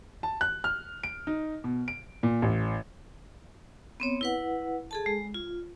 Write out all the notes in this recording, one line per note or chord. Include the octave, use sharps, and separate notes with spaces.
A5
F#6
F6
D7
D#4
B2
D7
A#2
A1
B3 C4 C#5
E4 B4 F#5
G#4 A4 A5
G#3
F4